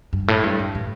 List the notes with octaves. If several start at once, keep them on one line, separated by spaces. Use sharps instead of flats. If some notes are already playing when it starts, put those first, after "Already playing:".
G2
A2
G2
E2
A2